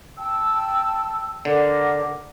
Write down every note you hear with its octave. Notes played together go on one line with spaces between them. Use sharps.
G5 A5 E6
D3 A#4 F#5 D6